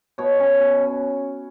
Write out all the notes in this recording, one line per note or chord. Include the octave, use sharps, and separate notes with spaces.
B2 C#5
C#4
B2
C#4